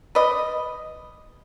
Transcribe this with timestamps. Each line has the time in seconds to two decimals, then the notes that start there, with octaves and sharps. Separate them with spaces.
0.15 B4 D5 D#5